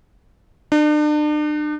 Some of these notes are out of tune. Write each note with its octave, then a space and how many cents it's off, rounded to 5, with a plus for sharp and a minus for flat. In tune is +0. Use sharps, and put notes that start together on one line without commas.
D4 +40